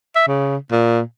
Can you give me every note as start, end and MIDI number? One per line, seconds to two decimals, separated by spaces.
0.16 0.23 76
0.27 0.56 49
0.71 1.01 46